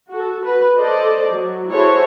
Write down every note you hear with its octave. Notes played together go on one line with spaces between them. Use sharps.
F#4 A4
F#4 B4
A4 C5 D5 D#5
F#3
E4 F#4 G#4 A4 C5 C#5